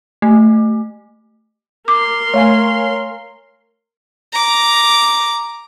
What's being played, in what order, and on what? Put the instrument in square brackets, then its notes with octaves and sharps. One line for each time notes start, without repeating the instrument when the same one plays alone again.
[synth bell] A3
[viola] A#4 C6 [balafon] D6
[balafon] A3 [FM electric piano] C#5 F5 G#5
[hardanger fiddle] A#5 D6